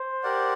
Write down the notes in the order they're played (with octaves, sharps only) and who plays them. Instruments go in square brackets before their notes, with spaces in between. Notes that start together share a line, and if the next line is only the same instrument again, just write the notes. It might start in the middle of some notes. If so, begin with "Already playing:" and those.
Already playing: [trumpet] C5
[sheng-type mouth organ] G4 A#4 D5 F#5